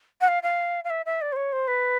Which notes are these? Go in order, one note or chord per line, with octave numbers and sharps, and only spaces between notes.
F#5
F5
F5
F5
E5
E5
D5
C5
C#5
C5
B4